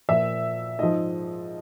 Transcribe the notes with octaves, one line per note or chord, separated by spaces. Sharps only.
A#2 F3 E5
G#2 F3 D#5